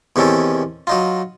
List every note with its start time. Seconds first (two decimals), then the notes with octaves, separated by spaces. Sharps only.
0.16 E2 C3 D#3 C#4 A4
0.87 F#3 D#4 F4